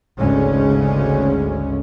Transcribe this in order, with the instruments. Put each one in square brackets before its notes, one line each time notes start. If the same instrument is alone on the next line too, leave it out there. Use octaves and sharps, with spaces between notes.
[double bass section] G#1 D2 C#3 G#3 C#4